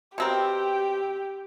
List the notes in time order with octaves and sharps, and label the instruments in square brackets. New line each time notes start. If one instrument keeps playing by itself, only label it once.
[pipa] B2 C4 A#4 [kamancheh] G4